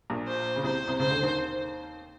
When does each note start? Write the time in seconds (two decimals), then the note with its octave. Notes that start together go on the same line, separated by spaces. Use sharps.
0.10 A#1 A#2
0.27 C5
0.56 C#3
0.64 C2 C3 C5
0.88 C2 C3
0.99 C#2 C#3 C5
1.11 D2 D3
1.23 D#2 D#3